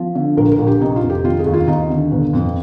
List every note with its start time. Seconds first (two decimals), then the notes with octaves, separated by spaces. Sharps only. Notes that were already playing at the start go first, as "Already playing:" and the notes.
Already playing: F3
0.15 D3
0.37 A#1 A#4
0.52 A#4
0.58 A#1
0.67 G4
0.80 C3 D#4
0.96 F4
1.03 F1
1.10 G4
1.24 D#3 F4
1.39 G#4
1.46 D#2
1.54 F4
1.67 D#2 D#4
1.90 D3
2.12 G1
2.33 F2